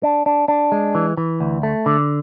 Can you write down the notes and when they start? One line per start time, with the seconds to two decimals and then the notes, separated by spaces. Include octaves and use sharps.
0.03 D4
0.26 D4
0.48 D4
0.72 G#3
0.95 E3
1.17 E3
1.40 D2
1.63 A3
1.86 D3